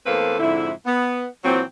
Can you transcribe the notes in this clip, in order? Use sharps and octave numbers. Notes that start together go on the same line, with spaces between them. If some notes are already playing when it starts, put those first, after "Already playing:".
E2 A3 A#3 C4 A4 B4
F2 G#2 D3 E4
B3
A#2 E3 F#3 C4